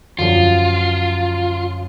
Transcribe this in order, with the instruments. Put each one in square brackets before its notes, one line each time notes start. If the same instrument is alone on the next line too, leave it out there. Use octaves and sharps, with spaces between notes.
[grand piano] F#2 D3 F3 [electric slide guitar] F4